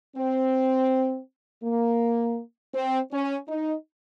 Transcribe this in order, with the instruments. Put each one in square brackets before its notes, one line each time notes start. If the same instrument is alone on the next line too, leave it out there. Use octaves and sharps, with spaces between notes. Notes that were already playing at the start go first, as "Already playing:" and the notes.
[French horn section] C4
A#3
C4
C#4
D#4